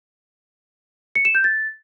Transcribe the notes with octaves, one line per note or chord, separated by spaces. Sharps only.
C#7
E7
G6
A6